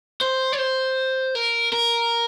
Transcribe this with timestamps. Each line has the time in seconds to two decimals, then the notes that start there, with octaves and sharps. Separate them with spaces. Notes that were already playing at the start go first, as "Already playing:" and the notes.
0.21 C5
0.52 C#5
0.59 C5
1.35 A#4
1.72 A#4